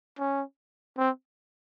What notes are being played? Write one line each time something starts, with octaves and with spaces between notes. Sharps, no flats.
C#4
C4